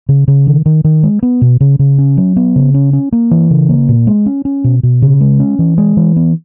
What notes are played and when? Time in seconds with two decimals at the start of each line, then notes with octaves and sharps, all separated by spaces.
0.09 C#3
0.28 C#3
0.47 D#3
0.66 D#3
0.84 D#3
1.03 G#3
1.23 B3
1.42 B2
1.60 C#3
1.79 C#3
1.98 C#4
2.17 F#3
2.36 B3
2.56 C#3
2.74 C#4
2.93 C#4
3.12 A#3
3.31 E3
3.51 C#3
3.69 A#3
3.88 A#2
4.07 G#3
4.26 C#4
4.45 C#4
4.64 B2
4.83 B2
5.02 C#3
5.21 G#3
5.40 C#4
5.59 E3
5.78 G#3
5.97 E3
6.16 B3